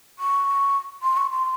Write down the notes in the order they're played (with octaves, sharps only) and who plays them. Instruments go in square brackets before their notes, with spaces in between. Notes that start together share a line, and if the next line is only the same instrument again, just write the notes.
[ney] C#6
C6
C#6
C6